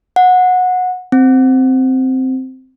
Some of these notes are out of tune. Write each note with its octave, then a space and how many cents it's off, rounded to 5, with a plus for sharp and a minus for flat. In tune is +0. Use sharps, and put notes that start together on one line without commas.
F#5 -20
C4 -5